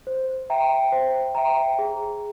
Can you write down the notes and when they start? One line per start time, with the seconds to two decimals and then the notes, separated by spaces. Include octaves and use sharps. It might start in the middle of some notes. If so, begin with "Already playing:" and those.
0.07 C5
0.50 E5 G5 A#5
0.92 C5
1.35 E5 G5 A#5
1.78 G#4